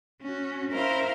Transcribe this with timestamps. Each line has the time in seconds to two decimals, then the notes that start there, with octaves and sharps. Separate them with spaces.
0.22 C#4 F#4
0.71 C#4 E4 A#4 C5 F5 A#5